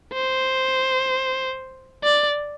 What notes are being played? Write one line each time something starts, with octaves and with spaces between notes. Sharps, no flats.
C5
D5